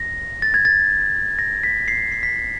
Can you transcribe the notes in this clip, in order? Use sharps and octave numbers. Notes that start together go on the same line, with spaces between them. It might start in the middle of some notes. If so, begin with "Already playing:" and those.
Already playing: A#6
A6
G#6
A6
A#6
B6
C7
C7
B6